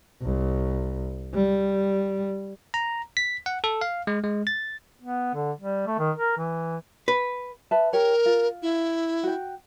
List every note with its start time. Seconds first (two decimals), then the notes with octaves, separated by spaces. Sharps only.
0.22 C2
1.34 G3
2.74 A#5
3.17 B6
3.46 F#5
3.64 A4
3.81 F5
4.07 G#3
4.24 G#3
4.47 A6
5.02 B3
5.35 D3
5.59 G3
5.87 A3
5.98 D#3
6.18 A#4
6.37 E3
7.08 B4
7.71 B4 E5 A5
7.93 G4 A#4 C#5
8.26 F4
8.62 E4
9.23 F#4 G5